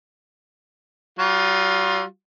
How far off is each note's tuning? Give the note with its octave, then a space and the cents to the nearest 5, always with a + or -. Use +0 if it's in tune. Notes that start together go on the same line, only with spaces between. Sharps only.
G3 -45 F4 +20